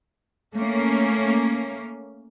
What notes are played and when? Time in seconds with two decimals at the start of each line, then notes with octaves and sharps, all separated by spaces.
0.54 A3 A#3 C#4